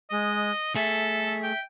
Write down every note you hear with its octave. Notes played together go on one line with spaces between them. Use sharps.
G#3 D#5
A3 G#4 A4 E5
G5